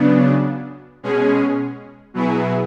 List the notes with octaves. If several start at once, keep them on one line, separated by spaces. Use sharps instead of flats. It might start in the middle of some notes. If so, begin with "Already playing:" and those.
Already playing: C#3 F#3 B3 D4
B2 G#3 C#4 G#4
B2 F#3 B3 E4 G#4